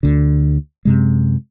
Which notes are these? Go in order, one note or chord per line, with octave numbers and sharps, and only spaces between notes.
D2 D3
F#2 C3 G#3